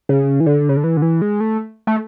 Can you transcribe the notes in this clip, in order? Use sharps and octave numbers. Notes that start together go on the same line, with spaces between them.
C#3
E3
D3
C#3
D3
E3
D3
E3
G#3
A3
A3